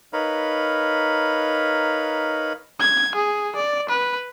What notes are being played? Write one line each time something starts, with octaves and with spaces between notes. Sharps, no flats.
D#4 A#4 B4 C#5 F5 B5
G#6
G#4
D5
B4